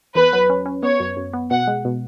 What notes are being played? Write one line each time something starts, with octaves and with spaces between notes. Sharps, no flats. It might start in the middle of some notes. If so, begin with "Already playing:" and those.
E2 B4
F#3
C#4
C#4
B3 C#5
F#2
F#2
B3
B2 F#5
G#3
B2